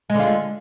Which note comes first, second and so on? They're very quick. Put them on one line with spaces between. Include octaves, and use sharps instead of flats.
G#3 D3 F4